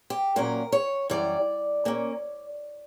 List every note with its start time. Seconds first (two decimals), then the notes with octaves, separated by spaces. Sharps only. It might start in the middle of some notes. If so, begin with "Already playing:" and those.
0.10 G4
0.36 A#2 F#3 A#3 C#4 A#4
0.72 C#5
1.10 F#2 E3 G3 C#4 D5
1.85 A#2 A#3 C#4